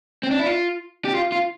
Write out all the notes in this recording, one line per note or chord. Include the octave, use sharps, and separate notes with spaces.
C4
D4
E4
F4
G4
F4
F4